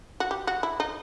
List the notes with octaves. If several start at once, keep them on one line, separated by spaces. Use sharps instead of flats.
F#4
G4
F#4
E4
D#4